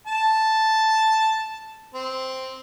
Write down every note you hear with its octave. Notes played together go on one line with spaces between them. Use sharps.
A5
C4